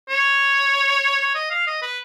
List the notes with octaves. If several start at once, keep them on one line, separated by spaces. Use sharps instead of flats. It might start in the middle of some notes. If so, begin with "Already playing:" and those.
C#5
C#5
D#5
F5
D#5
B4